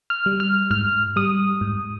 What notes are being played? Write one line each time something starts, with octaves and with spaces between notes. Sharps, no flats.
F6
G3
F6
G#2 F6
G3 D#6
G#2